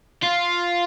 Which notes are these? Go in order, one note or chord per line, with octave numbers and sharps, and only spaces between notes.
F4